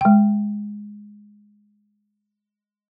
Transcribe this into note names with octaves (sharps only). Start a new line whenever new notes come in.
G#3 G5